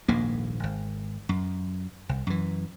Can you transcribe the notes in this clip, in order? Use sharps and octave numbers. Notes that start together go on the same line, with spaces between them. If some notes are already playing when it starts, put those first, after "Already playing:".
D#1 A#1 G#2 A#3
G#1
F#2
C2
F#2 E3